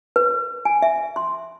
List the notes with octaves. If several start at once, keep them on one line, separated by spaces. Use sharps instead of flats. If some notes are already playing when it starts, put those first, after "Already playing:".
B4
G#5
E5
C6